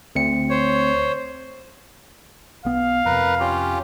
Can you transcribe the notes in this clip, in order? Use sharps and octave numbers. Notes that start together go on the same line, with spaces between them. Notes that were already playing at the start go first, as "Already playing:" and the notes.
D2 C4 C#7
C5 C#5
B1 B3 F5
F2 C3 A#4 B4
C#4 F4 G4